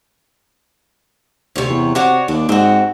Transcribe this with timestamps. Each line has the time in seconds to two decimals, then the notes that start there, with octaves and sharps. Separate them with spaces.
1.56 D2 C3 C#5
1.69 E2
1.95 C3 D4 F#4 C#5
2.28 D#2 D4
2.49 G#2 C4 F#4